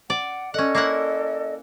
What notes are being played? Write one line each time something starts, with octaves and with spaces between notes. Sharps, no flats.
D5 F#5
C#4 A4 D5 D#5 F#5
A#3 E4 F#5